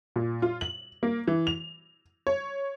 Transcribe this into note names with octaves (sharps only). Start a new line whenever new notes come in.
A#2
F4
F#7
A#3
E3
F7
C#5